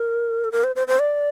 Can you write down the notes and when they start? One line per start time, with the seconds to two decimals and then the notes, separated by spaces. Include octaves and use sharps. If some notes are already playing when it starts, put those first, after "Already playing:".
Already playing: A#4
0.44 A4
0.52 A#4
0.64 C5
0.76 C5
0.88 C5
0.99 D5